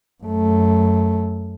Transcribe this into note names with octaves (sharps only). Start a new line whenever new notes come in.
F#2 A3